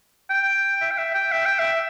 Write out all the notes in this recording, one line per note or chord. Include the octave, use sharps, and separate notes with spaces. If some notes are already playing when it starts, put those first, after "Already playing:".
G5
E5
G5
E5
G5
E5
G5
E5